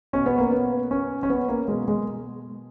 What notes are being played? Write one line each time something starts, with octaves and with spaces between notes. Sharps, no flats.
B2 C#4
B3
A#3
B3
C#4
C#4
B3
A#3
B2 G#3
G#3